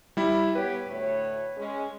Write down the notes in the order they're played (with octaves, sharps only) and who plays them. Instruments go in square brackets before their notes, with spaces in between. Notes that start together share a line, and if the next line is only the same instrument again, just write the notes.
[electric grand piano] G3 E4
[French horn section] B3 G4 C#5 [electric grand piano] B4
[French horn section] D2 A2 C#5
G#3 C#4